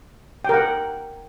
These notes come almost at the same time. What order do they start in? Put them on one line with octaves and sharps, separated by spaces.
G5 A#4 F#5